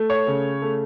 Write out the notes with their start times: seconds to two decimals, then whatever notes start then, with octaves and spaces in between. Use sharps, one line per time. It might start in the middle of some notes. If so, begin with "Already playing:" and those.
Already playing: A3
0.10 C#5
0.27 C#3
0.62 A3